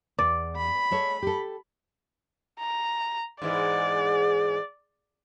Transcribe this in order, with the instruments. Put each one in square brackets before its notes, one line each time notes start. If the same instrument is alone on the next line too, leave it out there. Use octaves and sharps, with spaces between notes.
[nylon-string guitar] E2 [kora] D5
[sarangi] B5
[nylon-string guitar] G#3 A4 C#5
G4 A4
[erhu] A#5
[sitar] G#2 E3 G#3 [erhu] D5